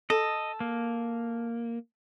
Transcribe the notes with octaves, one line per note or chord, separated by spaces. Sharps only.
A4 D#5
A#3